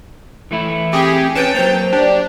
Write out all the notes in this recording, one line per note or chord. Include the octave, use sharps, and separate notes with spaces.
E3 A3 E4
C4 G4 G#4
C#4 B4 G5 A5
F#3 A#3 C5
D4 G4